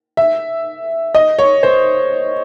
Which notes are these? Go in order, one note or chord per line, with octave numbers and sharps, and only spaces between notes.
E5
D#5
C#5
C5